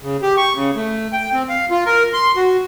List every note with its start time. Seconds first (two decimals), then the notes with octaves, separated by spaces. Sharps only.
0.01 C#3
0.22 G4
0.37 C#6
0.55 C#3
0.76 A3
1.13 G5
1.33 C4
1.49 F5
1.70 F4
1.86 A#4
2.13 C6
2.36 F#4